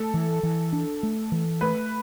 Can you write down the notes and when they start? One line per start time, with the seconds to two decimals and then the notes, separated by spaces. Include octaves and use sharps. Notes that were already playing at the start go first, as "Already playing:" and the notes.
Already playing: A3 A4
0.14 E3
0.43 E3
0.73 D4
1.03 A3
1.32 E3
1.61 A3 B4